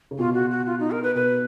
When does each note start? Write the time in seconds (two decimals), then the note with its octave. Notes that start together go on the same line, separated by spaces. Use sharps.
0.11 C#3
0.19 B2 F4
0.35 F#4
0.51 F#4
0.66 F4
0.80 D#4
0.91 A#4
1.03 B4
1.15 B2 B4